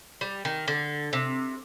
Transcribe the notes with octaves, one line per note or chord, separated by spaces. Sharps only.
G3
D#3
D3
C3